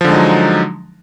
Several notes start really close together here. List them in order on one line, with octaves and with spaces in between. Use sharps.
F3 D3 G#3 D#4 F#3